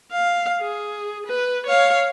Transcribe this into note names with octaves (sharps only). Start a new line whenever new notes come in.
F5
G#4
B4
C#5 F5